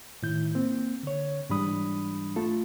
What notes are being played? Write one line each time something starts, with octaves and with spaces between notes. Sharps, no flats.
A2 D#3 E4 G6
A#3 C4
D3 C#5
G#2 E3 G3 D4 B5 D#6
A3 F4 A4